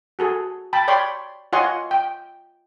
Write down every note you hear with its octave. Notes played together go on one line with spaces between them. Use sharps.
F#4 G#4 A4
G5 A5 B5
C#5 D5 G5 B5 C6
F4 C#5 D#5 F#5 G#5 C6
G5